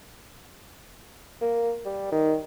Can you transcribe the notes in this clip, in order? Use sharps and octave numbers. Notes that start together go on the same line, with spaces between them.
A#3
G3
D#3